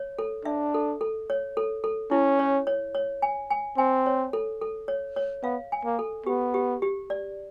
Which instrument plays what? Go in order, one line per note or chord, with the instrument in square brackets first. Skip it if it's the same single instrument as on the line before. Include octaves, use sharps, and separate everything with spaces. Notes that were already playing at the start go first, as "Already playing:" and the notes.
Already playing: [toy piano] C#5
A4
[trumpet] D4 [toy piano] E5
[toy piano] A4
A4
C#5
A4
A4
[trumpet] C#4 [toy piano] E4
[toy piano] C#5
C#5
C#5
G#5
G#5
[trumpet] C4 [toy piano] G#5
[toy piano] C#5
A4
A4
C#5
C#5
[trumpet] B3 [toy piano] F5
[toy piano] G#5
[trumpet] A#3
[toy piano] A4
[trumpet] B3 [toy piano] G4
[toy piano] G4
G4
D5